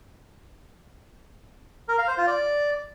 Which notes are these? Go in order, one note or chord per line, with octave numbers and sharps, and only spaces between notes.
A#4
F5
C5
F4
D5